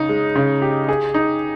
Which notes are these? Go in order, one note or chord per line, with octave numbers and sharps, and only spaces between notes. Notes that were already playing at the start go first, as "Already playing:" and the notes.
Already playing: C#3 D#4
G#3
C#3
G4
G#4
D#4